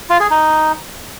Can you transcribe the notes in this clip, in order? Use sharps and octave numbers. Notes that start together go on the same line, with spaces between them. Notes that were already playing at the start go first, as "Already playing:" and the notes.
F4
G#4
D#4